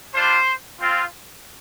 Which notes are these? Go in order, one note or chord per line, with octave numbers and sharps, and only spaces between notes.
G3 D4 F4 C5
C4 F4